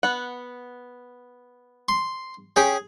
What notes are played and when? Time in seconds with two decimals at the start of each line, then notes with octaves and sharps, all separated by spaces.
0.03 B3 F#5
1.89 C6
2.56 C#4 G4 G#4 G5